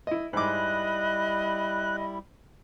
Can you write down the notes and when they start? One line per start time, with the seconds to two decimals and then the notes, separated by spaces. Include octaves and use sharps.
0.07 E4 D#5
0.33 G#2 G3 E4 D#5 D6 F#6